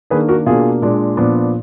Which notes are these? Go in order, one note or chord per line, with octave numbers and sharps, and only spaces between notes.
D#3 A#3 D4 G#4 B4
F#4 A#4
B2 A#3 D4 F4 G#4
A#2 G#3 D4
A#2 F3 B3 D4